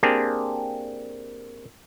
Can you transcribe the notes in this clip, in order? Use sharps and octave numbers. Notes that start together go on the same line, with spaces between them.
A#3 C4 D4 G4 G#4